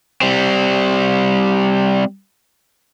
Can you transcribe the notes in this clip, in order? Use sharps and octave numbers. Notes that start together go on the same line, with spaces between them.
G3 C4